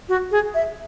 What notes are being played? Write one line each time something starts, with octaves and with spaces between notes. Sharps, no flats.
F#4
G#4
E5